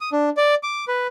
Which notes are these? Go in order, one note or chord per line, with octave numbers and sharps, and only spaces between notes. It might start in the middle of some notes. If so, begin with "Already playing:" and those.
D#6
D4
D5
D6
B4